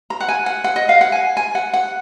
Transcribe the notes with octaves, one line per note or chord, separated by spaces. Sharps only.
A#5
F#5
G#5
F#5
F#5
D#5
F5
F#5
G#5
G#5
F#5
F#5